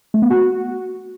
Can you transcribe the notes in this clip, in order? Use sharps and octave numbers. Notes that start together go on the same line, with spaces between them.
A3
B3
F#4